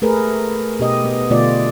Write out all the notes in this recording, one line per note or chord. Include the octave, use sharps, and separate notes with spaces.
A3 G#4 A#4 B4
B2 G4 D#5
B3
B2 D3 A3 F4 D5